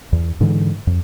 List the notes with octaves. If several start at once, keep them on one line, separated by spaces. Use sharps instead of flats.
E2
G#2 D3 E3 G#3
F2